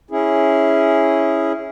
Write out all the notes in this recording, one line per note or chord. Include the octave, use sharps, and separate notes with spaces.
C#4 E4 G#4